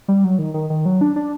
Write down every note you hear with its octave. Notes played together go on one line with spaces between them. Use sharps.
G3
F#3
D#3
D#3
D#3
F#3
D4
D4